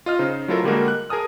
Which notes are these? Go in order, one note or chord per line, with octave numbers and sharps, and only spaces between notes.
F4 D#5 F6
C#3 D#4 C5
F#3 A3 E4 F4 A4 A#4
D3 G3 G#3 A#3 F#4 A#4
F#6
G#4 A#4 G#5 A5 D#6 F6